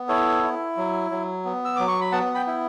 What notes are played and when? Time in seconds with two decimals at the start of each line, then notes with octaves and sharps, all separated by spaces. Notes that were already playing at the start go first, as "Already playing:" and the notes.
Already playing: B3
0.08 E4 A4 C#5
0.43 E4
0.77 F#3
1.11 F#3
1.45 B3
1.65 E6
1.76 F#3 D6
1.88 C#6
2.01 B5
2.12 B3 F#5 A5
2.35 G5 B5
2.47 E4